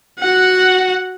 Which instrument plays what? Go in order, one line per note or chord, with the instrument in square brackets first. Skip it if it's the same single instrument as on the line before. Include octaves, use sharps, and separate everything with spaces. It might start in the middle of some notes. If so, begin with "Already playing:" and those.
[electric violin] F#4 F#5